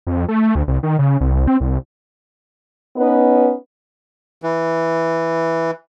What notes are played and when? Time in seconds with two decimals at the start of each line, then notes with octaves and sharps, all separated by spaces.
0.07 F2
0.28 A3
0.55 D2
0.68 C2
0.83 D#3
0.99 C#3
1.20 C2
1.47 C4
1.60 C2
2.96 B3 C#4 D#4 B4
4.42 E3